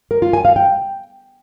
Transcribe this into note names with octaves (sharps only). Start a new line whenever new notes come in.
A#4
F4
G#5
F5
G5